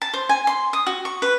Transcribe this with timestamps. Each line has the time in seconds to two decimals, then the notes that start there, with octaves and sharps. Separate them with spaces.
0.02 A5
0.14 C5
0.29 G#5
0.47 C6
0.73 D#6
0.87 F#4
1.05 C#6
1.22 B4